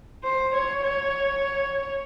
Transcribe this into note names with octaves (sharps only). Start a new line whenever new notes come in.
C5
C#5
C#5